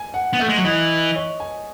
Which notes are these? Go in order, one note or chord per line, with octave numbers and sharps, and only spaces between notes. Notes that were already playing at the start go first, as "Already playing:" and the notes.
Already playing: G#5
F#5
B3
A3 E5
G#3
F#3
E3 D#5
C#5
G#5